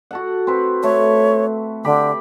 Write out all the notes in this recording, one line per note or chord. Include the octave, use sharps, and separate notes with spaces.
F#4 A4 F#5
C4 B4
A3 C#5
D3 G4 B5 D6